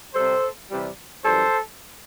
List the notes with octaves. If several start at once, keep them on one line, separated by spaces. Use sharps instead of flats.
C3 G3 A4 C5
C3 E3 G3
F#2 E3 G3 A4 C5